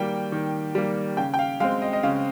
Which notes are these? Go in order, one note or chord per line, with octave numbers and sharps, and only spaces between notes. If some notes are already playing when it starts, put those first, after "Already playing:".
Already playing: D#3 G3 A#3 G5
D#3
G3 A#3
C#3 G5
G5
F5
G#3 C4 F5
D#5
D#5
C#3 F5